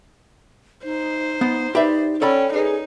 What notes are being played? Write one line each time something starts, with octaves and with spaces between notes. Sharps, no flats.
D#4 C5
B3
D#4 G4 B4 D5 E5
C#4 A4 D5 G5 B5
D#4 G#4 B4